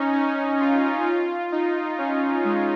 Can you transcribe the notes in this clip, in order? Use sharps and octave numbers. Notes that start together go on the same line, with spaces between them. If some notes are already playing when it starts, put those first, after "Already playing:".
Already playing: C#4 D#4
C#4
F4
F4
D#4
C#4
G#3